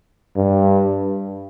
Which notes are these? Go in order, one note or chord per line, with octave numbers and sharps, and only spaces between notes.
G2